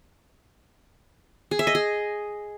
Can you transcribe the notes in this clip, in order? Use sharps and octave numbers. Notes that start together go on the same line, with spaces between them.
G#4
E5
D#5
G#4